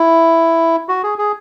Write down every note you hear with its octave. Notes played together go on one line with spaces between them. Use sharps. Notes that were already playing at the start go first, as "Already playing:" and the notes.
Already playing: E4
F#4
G#4
G#4